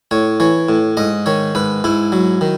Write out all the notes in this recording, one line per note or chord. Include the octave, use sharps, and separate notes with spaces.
A2 C#5
E3 C#5
A2
G#2 D#5
D#3 C#5
G#2 B4
G#2 E4
F#3
D#3